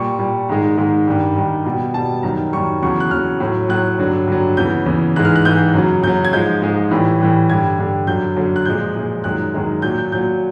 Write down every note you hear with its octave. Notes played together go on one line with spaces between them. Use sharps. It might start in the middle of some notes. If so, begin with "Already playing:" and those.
Already playing: A#2 G3 C#6
A#2 G3
G#2 D#3 G#3
G#2 D#3 G#3
G2 D#3 G3
G2 D#3 G3
B2 G3
B2 G3 A5
F#2 D#3 G3 A#5
F#2 D#3 G3 C#6
E2 C#3 F#3 C#6
F#6
E2 C#3 F#3 F6
A2 F#3
A2 F#3 F#6
G2 D3 F#3
G2 D3 F#3
E2 C#3 E3 G6
E2 C#3 E3
G#2 E3 G#3 F#6
F6
F#6
G#2 E3 G#3 G6
F#2 C#3 F#3
F#2 C#3 F#3 G6
G#6
G#2 F3 G#3 G6
G#2 F3 G#3
A2 E3 G3
A2 E3 G3
G2 D3 G3 G#6
G2 D3 G3
F#2 D3 F#3 G6
F#2 D3 F#3
F#6
A#2 F3 G#3 G6
A#2 F3 G#3
F#2 D#3 G#3 F#6
F#2 D#3 G#3
A#2 F#3 G6
G6
A#2 F#3 G6